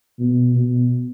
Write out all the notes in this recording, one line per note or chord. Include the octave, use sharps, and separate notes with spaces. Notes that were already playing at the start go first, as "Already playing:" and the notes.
B2
B2